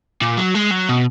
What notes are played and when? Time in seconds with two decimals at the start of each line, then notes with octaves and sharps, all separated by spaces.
0.22 A#2
0.38 F#3
0.55 G#3
0.71 F#3
0.89 B2